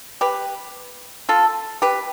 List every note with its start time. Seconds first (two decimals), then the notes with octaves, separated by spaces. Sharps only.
0.21 G4 B4
1.29 F4 A4
1.82 G4 B4